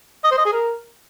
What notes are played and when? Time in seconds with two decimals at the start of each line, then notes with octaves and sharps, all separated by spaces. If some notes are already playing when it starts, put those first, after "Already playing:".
0.24 D#5
0.31 C5
0.38 D#5
0.45 G#4
0.52 A#4